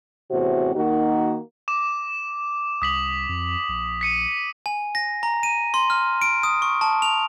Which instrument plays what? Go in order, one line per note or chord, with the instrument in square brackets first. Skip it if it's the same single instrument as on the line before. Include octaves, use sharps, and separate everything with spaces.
[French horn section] E2 A2 C3 C4 F#4
D#3 A#3 D#4 F#4
[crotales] D6 E7
[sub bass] C2 [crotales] D#6 B6 F#7
[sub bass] F2
A#1
[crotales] B6 C#7 D#7
[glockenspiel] G#5
A#6
A#5
D#7
C6
F6
D7
D#6
C#6
A5
F7